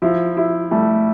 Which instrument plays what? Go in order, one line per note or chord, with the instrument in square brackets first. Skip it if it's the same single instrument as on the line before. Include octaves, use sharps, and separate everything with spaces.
[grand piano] F3 [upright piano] E4
[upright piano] E4
[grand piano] G3 [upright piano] A3